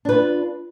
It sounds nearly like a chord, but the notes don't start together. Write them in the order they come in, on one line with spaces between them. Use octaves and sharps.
D4 B4 F4